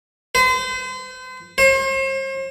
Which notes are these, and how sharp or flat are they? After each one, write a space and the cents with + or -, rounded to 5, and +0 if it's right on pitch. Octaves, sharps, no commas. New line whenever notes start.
C5 -40
C5 +40